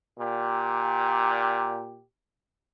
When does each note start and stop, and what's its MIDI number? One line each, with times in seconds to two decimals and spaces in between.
0.19 2.04 46
0.19 2.04 67